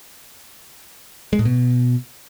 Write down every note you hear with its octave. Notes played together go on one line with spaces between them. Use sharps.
G#3
A2
B2